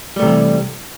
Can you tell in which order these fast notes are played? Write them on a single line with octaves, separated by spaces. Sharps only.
G3 A3 C3 E3